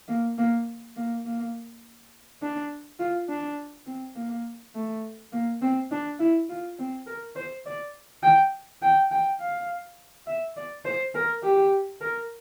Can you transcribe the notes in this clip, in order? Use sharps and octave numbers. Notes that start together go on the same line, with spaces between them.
A#3
A#3
A#3
A#3
D4
F4
D4
C4
A#3
A3
A#3
C4
D4
E4
F4
C4
A#4
C5
D5
G5
G5
G5
F5
E5
D5
C5
A#4
G4
A#4